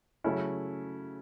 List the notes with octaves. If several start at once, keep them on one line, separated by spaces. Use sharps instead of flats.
C#3 F#3 A3 C#4 E4